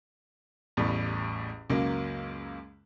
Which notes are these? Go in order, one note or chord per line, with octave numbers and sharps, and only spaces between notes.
A1 E2 A2 G3
C#2 F#2 F#3 A#3